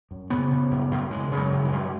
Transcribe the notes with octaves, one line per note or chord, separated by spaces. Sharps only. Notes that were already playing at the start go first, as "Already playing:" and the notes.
F#2
C#3 B3
C#3
F#2
F#2
C#3 G#3
C#3
F#3
F#2
G#3
F#2